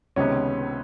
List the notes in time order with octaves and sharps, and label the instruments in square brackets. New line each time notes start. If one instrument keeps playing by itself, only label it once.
[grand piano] C#2 C3 D#3 G#3 B3 [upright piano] C#4